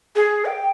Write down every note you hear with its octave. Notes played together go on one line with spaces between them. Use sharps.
G#4
G5